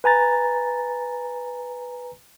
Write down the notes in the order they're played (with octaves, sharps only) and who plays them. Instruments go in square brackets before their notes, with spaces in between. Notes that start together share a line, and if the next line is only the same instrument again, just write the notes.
[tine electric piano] B4 G#5 A#5 A6